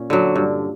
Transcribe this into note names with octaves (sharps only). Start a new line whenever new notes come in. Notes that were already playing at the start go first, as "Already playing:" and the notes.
Already playing: A#2 C#4
D3 F#3
G2